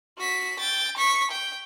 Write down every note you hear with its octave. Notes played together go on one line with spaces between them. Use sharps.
F#4 B6
G5 A6
C#6 B6
G5